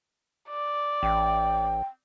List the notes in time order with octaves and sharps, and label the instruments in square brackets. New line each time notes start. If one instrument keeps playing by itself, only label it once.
[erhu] D5
[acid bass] A1 [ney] G5